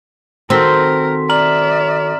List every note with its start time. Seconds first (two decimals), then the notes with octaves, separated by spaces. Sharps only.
0.50 D#3 C4 F#4 A4 A#4 C6 B6
1.29 D5 E5 A#5 F6 F#7